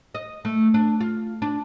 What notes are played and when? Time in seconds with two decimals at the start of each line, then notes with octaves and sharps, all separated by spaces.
0.15 D#5
0.45 A3
0.74 D4
1.00 F4
1.42 D4